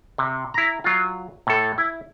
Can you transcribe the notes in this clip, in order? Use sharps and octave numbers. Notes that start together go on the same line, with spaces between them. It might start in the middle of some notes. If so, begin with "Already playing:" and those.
C3
E4 A#5
F#3 F4
A2 A4
E4